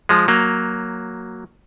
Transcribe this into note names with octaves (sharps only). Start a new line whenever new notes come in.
F3 G#3
F#3 A#3